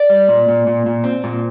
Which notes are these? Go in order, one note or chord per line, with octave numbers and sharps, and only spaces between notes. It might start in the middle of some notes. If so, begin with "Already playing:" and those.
Already playing: D5
G3
A#2
A#2
A#2
A#2
C4
A#2